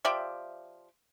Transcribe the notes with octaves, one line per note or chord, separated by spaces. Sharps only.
F3 G4 D5 E5